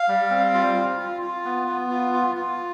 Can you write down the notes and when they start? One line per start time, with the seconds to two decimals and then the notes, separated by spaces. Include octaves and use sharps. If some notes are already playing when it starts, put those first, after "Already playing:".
Already playing: F5
0.08 G3
0.30 C4
0.54 F4
0.77 F4
0.99 F4
1.22 F4
1.45 B3
1.68 B3
1.91 F4
2.14 F4
2.37 F4